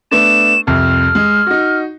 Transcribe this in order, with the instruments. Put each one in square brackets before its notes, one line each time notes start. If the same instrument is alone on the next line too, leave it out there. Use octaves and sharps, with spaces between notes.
[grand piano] A3 B3 D4 [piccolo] E7
[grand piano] C2 F2 [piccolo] F6
[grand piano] G#3
D#4 F#4